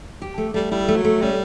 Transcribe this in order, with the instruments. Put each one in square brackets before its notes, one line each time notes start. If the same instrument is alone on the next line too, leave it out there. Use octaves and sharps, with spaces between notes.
[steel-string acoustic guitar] G4
A3
[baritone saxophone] G3 [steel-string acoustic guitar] A3
[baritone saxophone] G3 [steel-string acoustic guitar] E4
[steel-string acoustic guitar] A3
[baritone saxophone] F#3
[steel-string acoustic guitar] A3
[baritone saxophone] G3 [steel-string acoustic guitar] C#4